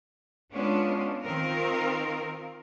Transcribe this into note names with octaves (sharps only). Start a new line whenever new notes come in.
G#3 B3 C#4 D4 F4
D#3 C4 F4 A#4